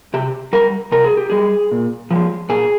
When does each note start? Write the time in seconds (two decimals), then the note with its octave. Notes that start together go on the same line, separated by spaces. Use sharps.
0.14 C3 G4
0.53 G3 A#4
0.92 C3 A#4
1.04 G#4
1.17 G4
1.30 G3 G#4
1.71 A#2
2.11 F3 G#3
2.49 A#2 G#4